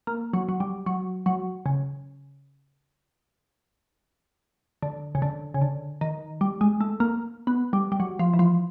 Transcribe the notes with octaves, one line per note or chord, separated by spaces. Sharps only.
A#3
F#3
F#3
G3
F#3
F#3
C#3
D3
C#3
D3
C#3
D3
D#3
G3
G#3
A3
A#3
B3
G3
G3
F#3
F3
E3
F3